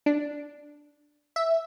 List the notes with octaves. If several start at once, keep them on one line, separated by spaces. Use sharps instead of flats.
D4
E5